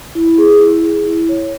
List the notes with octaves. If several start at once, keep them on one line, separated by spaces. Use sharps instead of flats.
E4
G#4
E4
G#4
E4
C#5